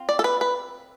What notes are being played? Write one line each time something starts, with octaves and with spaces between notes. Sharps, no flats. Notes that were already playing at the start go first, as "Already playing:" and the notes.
Already playing: C4 F4
D5
A4
B4
B4